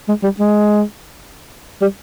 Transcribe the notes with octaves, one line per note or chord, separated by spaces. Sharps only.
G#3
G3
G#3
G3